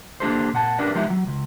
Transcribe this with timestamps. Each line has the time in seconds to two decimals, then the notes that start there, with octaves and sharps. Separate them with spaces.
0.20 A#3 D4 G4 A4 C5
0.53 A#2 F#5 A5
0.78 C#4 D4 G4 A#4 B4 D5
0.95 F3 G#3 B3 D#4 E4 G4
1.10 F#3
1.27 C#2